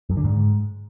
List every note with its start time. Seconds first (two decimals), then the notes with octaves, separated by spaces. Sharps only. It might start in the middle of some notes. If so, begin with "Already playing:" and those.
0.10 F#2
0.17 D3
0.24 G#2